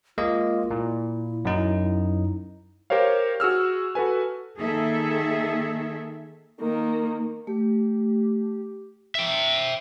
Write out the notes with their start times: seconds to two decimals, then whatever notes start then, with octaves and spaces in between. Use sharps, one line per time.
0.18 G#3 A#3 F4 D#5
0.71 A#2 E4
1.45 F#2 D#4
2.90 G4 A#4 C5 C#5 F5
3.40 F#4 G#4 E6 F6
3.95 F#4 A4 B4 G#5
4.58 D#3 A#3 G#4 A4 E5
6.60 D#3 A#3
7.47 A3 G4
9.15 E5 G5